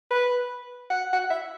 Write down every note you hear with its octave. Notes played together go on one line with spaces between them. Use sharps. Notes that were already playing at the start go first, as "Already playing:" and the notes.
B4
F#5
F#5
E5